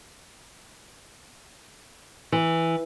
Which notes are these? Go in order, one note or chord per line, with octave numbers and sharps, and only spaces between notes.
E3